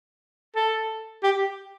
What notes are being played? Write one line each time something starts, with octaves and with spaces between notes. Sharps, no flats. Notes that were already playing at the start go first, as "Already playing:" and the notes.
A4
G4